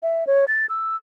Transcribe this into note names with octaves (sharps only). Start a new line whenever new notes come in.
E5
C#5
A6
E6